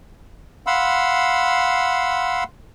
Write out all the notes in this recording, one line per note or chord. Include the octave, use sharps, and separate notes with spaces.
F5 F#5 B5 C6 E6